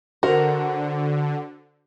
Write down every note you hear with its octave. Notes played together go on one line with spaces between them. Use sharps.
D3 F#4 A#4 C5 F#5